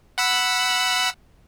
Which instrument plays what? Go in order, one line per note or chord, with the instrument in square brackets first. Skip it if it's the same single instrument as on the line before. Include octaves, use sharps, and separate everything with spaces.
[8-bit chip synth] F#5 B5 E6